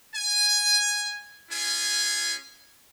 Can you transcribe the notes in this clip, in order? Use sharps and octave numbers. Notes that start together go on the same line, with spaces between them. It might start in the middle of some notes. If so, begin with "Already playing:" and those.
G#5
C#4 F4 G#4 G#5